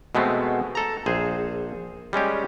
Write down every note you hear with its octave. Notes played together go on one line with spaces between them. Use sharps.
B2 G#3 A3 B3 C4
A4 A#5
A#1 G#4 C5
G3 G#3 C#4 G4